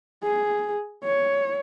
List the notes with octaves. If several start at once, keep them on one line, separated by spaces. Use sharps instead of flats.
G#4
C#5